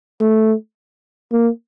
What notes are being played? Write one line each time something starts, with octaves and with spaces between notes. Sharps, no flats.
A3
A#3